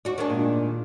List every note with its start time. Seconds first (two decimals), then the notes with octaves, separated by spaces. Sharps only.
0.05 D#2 F#4 D5
0.18 D#3 G#3 D4
0.30 A#2